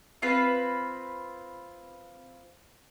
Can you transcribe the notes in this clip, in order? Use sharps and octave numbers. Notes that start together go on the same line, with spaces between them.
C4 F4 B4